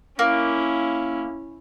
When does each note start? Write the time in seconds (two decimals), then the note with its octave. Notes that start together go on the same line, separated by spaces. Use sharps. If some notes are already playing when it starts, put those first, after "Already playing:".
0.19 A#3 C#4 E4